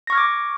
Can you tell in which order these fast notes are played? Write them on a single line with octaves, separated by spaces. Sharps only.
A#6 C#6 F6 G#6 D6